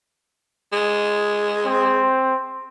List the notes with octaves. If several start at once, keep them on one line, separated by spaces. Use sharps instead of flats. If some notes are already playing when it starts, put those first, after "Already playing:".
G#3
C4